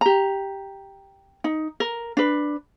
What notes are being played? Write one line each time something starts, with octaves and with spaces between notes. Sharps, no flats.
G4 A#5
D#4
A#4
D4 B4